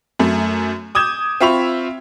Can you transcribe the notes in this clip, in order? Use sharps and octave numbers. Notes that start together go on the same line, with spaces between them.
F#2 A3
D6 D#6 G6 G#6 E7
C4 F4 E5 B5 C#6 F7